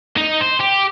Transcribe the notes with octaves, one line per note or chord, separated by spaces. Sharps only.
D#4
C5
G4